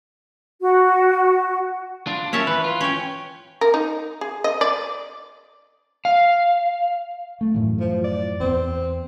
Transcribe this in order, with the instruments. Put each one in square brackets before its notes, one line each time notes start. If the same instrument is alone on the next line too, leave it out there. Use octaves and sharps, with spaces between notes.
[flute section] F#4
[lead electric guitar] D4 F4
[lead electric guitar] A#3 C#4 [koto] C#5 E5 A5
[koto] E3 [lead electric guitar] B4
[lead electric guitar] F4
[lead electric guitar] C#4 [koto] C#5 G5
[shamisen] A#4
D#4
G#4
D#5
D5
[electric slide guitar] F5
[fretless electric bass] A3
F#2 A2 E3
[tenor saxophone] F3
D5
[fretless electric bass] E2 B3 [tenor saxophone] C4